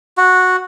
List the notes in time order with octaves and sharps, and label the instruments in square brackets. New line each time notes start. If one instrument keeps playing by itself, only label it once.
[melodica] F#4